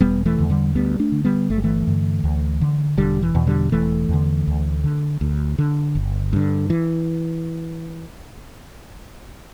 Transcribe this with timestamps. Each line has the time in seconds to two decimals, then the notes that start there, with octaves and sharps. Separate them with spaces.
0.01 E1 G3 B3
0.26 E3 A3
0.38 E2 D3
0.50 D3 G3
0.75 D2 G3 B3
0.99 A3 D4
1.12 D3
1.25 G3 B3
1.50 G1 A3
1.57 G3
1.64 E3 A3
1.87 G2 D3
2.24 D2
2.61 D3
2.97 E1 D3 G3
3.22 E3
3.35 E2 B2
3.47 D3 G3
3.72 E1 E3 A3
4.09 E2 D3
4.47 D2
4.84 D3
5.21 D2
5.58 D3
5.95 G1
6.33 G2 D3
6.70 E3